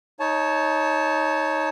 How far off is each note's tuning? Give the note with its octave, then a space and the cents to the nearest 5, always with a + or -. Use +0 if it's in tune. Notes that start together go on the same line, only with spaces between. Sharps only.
D#4 +15 C#5 +0 A5 -15